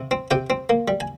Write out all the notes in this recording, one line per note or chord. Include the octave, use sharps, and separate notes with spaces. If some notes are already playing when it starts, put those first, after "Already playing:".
Already playing: C3
C4
C3 G4 G5
C4
A#3
G3
G#5